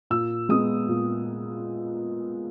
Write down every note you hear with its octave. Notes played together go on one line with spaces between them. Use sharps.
A#2 E6
G#3 B3 D#6
A#2